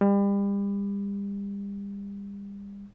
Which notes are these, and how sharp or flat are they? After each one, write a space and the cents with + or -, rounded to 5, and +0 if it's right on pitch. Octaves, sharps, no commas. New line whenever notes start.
G3 +35